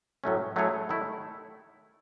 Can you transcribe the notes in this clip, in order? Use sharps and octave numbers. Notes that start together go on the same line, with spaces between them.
A2 F#3 A3 C#4
F#3 A3 E4 G#4 C#5
D#3 A3 E4